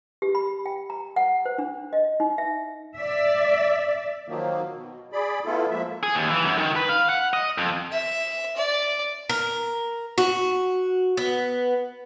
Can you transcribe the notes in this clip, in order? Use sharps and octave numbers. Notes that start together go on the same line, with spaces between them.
G4
B5
G5
A#5
F#5
C5
D4
D#5
D#4
E5
D5 E5
D#3 F3 F#3 A#3
B2
G#4 D5 B5
A3 B3 E4 F4 A4
F3 G#3 A#3 E5
G#4
D#2
E3
F#2
D#3
B4
F5
F#5
D#5
F2
E5
D5
A#4
F#4
B3